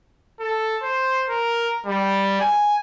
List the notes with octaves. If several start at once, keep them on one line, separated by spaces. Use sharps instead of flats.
A4
C5
A#4
G3
G#5